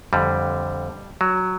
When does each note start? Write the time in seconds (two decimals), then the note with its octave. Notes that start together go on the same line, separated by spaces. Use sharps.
0.13 F2 D3 G3
1.21 F#3